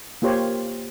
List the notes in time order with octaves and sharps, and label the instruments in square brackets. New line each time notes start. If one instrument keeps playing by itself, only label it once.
[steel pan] A#3 F4 G4 C5 C#5